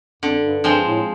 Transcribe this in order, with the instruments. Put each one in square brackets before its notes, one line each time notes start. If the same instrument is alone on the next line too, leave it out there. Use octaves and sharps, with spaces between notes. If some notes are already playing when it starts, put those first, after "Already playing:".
[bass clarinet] F2 [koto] D3
[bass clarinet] G2
[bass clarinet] G2 [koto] F3 G#3 C4
[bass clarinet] A2